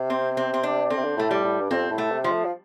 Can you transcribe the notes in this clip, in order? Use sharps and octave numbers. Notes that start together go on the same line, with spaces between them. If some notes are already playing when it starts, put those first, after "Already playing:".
Already playing: C3
C4
C4
C4
D4
D3 C4
C3
D3
A2 A3
G3
A2
G2
F2 C4
A2
A3
C3
F3
A3
F3